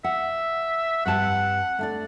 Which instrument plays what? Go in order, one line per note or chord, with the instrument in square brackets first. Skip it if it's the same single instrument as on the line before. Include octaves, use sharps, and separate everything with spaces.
[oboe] E5 [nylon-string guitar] F#5
[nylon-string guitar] G2 C4 A5 [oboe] F#5
[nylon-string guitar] A3 D4 D5